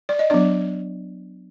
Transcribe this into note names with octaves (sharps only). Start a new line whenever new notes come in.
D5
D#5
F#3 B3 D4 D5